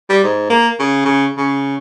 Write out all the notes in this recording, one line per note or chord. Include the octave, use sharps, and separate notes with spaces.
G3
G#2
A#3
C#3
C#3
C#3